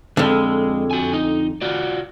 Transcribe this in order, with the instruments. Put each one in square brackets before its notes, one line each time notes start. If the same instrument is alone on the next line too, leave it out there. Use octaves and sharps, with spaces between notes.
[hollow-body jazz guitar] F2 D3 [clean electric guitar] G#3
[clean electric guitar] F#4 G#5
D#4
F4 F#4 D5